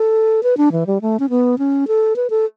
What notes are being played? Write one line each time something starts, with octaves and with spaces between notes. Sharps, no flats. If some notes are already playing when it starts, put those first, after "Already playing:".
Already playing: A4
B4
D4
E3
G3
A3
C#4
B3
C#4
A4
B4
A4